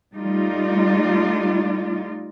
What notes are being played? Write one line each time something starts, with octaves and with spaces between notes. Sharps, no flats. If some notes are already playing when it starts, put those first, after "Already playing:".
G3 A3 D#4 F4 D5